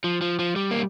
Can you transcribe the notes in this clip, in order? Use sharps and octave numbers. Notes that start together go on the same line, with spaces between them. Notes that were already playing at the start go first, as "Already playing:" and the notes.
F3
F3
F3
G3
A#3